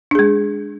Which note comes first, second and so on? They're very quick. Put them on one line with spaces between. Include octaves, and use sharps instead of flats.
D4 G#4 G#3